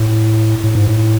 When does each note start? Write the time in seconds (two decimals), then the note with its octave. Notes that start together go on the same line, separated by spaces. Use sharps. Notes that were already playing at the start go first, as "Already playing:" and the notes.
Already playing: A2
0.64 A2
0.75 G#2
0.87 A2